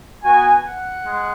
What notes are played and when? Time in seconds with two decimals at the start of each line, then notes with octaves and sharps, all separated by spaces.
0.23 B3 F#4 G#5
0.64 F#5
1.04 G#3